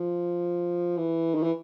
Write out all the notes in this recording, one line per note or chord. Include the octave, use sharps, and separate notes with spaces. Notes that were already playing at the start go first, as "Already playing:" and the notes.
Already playing: F3
E3
D#3
E3